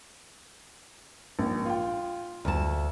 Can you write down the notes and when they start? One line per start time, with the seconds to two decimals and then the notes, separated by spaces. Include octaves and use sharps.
1.39 A#1
1.65 F4 G5
2.45 D2 A5